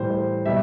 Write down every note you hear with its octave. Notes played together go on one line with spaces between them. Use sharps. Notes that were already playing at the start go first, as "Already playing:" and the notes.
Already playing: A2 E3 G3 C5
C5
B2 G3 E5